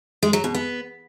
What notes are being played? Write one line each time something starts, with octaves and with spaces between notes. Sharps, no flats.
G#3
F#3
B2
B3